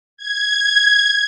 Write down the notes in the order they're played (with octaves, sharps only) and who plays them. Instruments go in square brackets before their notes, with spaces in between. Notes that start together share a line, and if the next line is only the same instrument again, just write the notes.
[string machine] G#6